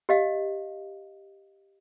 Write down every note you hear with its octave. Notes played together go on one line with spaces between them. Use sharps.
G4 D#5 F5